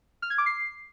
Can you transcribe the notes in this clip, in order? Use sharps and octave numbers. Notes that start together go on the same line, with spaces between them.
F6
G#6
D6
C7